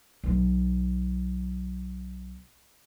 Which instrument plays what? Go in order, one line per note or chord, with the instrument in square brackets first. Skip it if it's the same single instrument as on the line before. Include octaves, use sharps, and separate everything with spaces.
[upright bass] B1 F#3